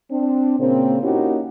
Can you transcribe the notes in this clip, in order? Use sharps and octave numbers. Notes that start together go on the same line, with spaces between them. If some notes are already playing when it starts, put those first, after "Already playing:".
C4 D4
A#2 C#3 A#3 C4
A#3 C#4 D#4 E4 F#4 G4